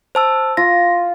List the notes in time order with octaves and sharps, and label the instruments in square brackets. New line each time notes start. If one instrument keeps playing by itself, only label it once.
[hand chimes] C5 A5 E6
[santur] F4 [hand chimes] A#6